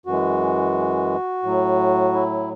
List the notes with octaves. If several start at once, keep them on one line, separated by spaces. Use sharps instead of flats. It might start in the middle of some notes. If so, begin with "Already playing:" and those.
F#2 E3 G#3 F#4
A2 F#3
E4